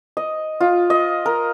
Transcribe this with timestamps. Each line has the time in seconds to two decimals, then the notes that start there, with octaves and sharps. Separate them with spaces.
0.17 D#5
0.61 F4
0.90 D#5
1.26 A#4